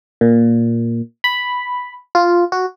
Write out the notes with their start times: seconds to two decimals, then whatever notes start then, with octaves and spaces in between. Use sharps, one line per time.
0.21 A#2
1.24 B5
2.15 F4
2.52 F#4